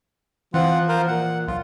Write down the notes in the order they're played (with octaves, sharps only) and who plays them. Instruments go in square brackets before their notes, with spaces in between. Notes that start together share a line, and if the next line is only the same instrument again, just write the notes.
[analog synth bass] E3 [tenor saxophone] F3 [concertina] C4 F4 F#5
[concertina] F4 A#4 C5
[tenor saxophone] A#2 [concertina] F#5
[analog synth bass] B1 [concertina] F4